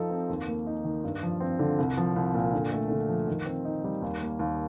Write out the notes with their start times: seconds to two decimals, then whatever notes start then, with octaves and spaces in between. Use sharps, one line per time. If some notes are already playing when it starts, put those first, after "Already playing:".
Already playing: F3 D#4 A4
0.10 C4
0.30 D#2
0.48 A#3
0.67 D#4
0.84 D#3
1.04 G2
1.23 F3
1.40 C4
1.59 D3
1.78 C2
1.97 F3
2.16 C2
2.34 A#2
2.54 D3
2.72 A3
2.90 D3
3.09 F3
3.28 D#3
3.46 C4
3.65 D#4
3.84 G3
4.02 D#2
4.22 A#3
4.39 D#2